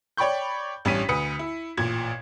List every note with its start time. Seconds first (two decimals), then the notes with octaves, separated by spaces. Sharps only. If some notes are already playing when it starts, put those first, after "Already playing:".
0.17 C#5 D5 G5 B5 C#6 G6
0.85 A1 G2 C#4 B6 D#7
1.09 D2 B4 D#6 C#7
1.39 E4
1.77 A1 A#2 G#6